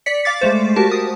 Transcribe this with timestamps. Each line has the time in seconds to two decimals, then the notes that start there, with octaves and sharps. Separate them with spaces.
0.06 D5 B6 C#7
0.25 F5 D6 A6
0.41 G#3 A3 C5
0.76 F#4 G4 A#4 A5
0.91 D#6